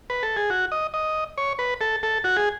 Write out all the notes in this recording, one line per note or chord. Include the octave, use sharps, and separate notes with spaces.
B4
A4
G#4
F#4
D#5
D#5
C#5
B4
A4
A4
F#4
G#4